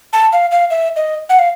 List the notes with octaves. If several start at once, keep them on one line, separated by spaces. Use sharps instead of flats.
A5
F5
F5
E5
D#5
F#5
F5